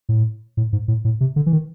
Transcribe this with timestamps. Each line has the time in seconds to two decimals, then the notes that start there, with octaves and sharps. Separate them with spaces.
0.09 A2
0.57 A2
0.73 G#2
0.88 A2
1.05 A2
1.21 C3
1.36 D3
1.46 E3
1.52 D#3